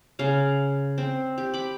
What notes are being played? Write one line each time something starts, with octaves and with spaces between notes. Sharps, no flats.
C#3 F5
C4
G4
B5 D6